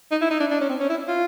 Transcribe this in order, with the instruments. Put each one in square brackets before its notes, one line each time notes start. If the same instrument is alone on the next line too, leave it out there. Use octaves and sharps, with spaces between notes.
[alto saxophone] D#4
E4
D#4
D4
D4
C#4
C4
C#4
E4
F4